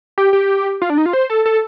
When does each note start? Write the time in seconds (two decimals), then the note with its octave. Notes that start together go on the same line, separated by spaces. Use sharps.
0.18 G4
0.33 G4
0.82 F4
0.90 D4
0.98 D#4
1.06 F4
1.13 C5
1.30 A4
1.46 A4